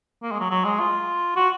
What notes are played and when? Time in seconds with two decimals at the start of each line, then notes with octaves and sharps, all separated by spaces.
0.22 A#3
0.31 G#3
0.40 F#3
0.51 F#3
0.64 G#3
0.80 F4
1.36 F#4